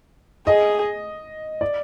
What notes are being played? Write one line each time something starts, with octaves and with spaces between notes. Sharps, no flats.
G#4 D#5
D5